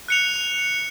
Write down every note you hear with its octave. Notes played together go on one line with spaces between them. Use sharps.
F#6 C#7 F7